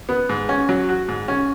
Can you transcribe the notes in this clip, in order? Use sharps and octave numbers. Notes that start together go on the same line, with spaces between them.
B3
G#2
C#4
F#3
F#4
G#2
C#4